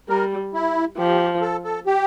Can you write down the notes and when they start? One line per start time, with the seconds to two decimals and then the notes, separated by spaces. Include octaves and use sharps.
0.09 G3 A#4
0.54 E4
0.98 F3 G4
1.41 A4
1.64 A4
1.86 G4